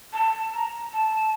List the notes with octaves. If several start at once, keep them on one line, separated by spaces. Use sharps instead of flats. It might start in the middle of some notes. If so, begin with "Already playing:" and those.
A5
A#5
A5